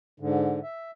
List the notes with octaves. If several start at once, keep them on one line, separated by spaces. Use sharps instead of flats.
G#2 D3
E5